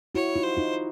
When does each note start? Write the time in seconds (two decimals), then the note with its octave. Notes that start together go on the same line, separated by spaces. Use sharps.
0.15 E4 F#4 C#5
0.36 D#4 F4
0.43 C5
0.57 D#4 F4